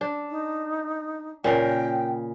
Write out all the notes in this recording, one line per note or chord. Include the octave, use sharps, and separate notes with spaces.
D4
D#4
A#2 C#3 A#4 G5